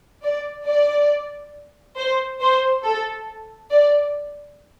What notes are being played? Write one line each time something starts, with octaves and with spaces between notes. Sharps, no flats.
D5
D5
C5
C5
A4
D5